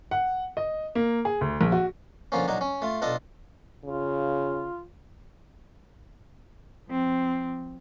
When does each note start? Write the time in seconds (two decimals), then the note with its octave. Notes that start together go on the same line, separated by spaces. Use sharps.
0.11 F#5
0.57 D#5
0.95 A#3
1.25 G#4
1.41 D2
1.61 A#1
1.72 F#4
2.32 D3 F3 A#3 C#4
2.48 A#1 F#3 D4 D#4
2.61 C#4
2.82 A3 F4
3.02 B1 D4 F4 A4 D#5
3.84 C#3 F4
6.87 F3 C4